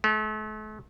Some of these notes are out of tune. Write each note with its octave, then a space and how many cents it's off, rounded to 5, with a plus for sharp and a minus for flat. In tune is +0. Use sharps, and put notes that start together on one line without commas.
A3 -40